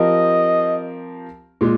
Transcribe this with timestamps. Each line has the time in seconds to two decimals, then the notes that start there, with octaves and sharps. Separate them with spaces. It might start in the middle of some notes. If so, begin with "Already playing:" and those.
Already playing: F3 C4 G4 A#4 D#5
1.61 A#2 G#3